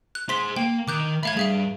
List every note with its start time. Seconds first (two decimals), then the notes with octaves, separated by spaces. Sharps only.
0.15 F#6
0.29 G#4 C5 C6 B6
0.56 A#3 G5
0.88 D#3 D6 F#6 G6
1.23 A3 E5 F5 B5 G#6
1.37 G2 G#4 E5 F5